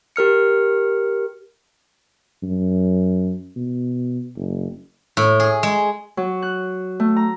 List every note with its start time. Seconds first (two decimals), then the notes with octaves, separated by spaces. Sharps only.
0.16 G4 A#4 F6 C#7
2.43 F#2
3.56 B2
4.36 F#1
5.17 A2
5.40 G#4
5.63 G#3
6.17 F#3
6.42 F#6
7.00 A3
7.16 A#5